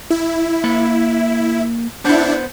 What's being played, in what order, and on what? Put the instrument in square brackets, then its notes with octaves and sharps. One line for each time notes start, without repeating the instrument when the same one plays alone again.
[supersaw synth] E4
[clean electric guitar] A#3 B5
[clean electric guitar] B3 C5 F#5 [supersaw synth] D4 E4